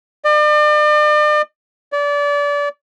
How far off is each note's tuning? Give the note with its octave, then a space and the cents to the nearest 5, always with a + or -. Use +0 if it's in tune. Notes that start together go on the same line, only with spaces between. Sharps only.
D5 +40
D5 -30